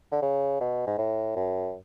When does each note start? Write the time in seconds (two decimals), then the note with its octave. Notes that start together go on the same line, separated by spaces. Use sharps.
0.12 D3
0.22 C#3
0.61 B2
0.87 G#2
0.98 A2
1.36 F#2